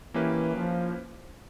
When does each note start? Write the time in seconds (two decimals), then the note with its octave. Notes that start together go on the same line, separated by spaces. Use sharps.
0.14 E3 A#3 C#4 E4 G4 B4
0.56 F3